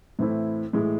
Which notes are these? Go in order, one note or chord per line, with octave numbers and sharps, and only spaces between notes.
A2 E3 A3 C4 E4
A2 E3 G#3